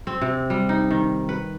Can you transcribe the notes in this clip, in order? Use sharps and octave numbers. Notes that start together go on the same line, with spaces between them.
C4
C3
G3
D#4
D#3
B4